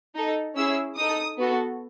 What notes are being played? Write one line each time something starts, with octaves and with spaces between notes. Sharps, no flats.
D#4 A4
C#4 E4 G#4 E6
D#4 A4 D#6
B3 F#4 A4